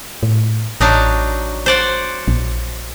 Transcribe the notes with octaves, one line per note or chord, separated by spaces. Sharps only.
A2
A1 F#3 D4 D#4
C5 D5 F#5
A#1